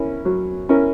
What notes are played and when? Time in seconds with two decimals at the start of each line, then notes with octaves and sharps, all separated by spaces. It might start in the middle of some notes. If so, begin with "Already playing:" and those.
Already playing: C#4 E4 A#4
0.25 F#3
0.69 C#4 E4 A#4